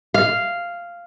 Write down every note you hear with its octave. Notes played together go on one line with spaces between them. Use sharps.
F5